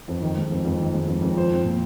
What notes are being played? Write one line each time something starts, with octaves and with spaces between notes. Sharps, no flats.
F2
D#3
G#3
F2
F2
D#3
G#3
F2
F2
F3 C5
C4
A#2